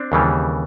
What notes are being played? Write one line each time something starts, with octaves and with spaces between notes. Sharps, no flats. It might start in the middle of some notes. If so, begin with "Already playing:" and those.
Already playing: C4 D4
D#2 C#3 E3 G3